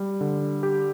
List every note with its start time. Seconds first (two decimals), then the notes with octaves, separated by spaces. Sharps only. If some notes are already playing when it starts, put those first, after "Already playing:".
Already playing: G3
0.21 D3
0.63 G4